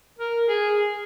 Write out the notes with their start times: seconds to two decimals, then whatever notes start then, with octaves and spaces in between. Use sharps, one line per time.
0.19 A#4
0.48 G#4